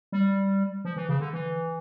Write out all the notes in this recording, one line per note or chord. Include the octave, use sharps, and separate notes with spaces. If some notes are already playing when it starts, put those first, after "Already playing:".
G3
F3
E3
C#3
D3
E3